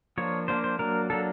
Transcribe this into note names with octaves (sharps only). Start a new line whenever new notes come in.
F3 A#3 D4 C#5
F3 A#3 D4 C5
C5
F#3 A#3 D4 A#4
F#3 A#3 D4 A4